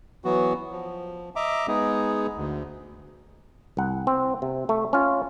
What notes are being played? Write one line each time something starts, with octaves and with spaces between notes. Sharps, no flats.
E3 F#3 B3 F#4
F3
D#5 E5 A#5 D6
G#3 B3 D#4 G#4
D2
C2 F#5
C4
C3
A3
C#4 F4